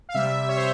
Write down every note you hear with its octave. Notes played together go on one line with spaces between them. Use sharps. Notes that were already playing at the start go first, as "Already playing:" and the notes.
F5
C3 G3 E5
C#5
C5